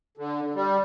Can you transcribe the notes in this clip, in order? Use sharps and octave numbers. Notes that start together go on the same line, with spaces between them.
D3
G3